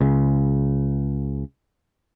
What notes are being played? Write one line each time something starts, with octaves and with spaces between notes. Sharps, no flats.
C#2 C#3